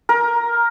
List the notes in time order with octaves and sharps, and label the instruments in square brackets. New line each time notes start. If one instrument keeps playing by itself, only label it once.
[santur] A#4